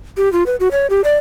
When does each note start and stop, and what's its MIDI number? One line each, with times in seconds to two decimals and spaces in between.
0.17 0.31 67
0.32 0.43 65
0.46 0.56 71
0.60 0.68 66
0.72 0.87 73
0.90 1.01 67
1.04 1.17 74